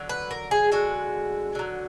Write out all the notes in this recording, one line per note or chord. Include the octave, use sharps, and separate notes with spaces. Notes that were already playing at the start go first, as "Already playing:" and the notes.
Already playing: D3 F#3
B4
A#4
G#4
D3 G#3 F#4
D3 F#3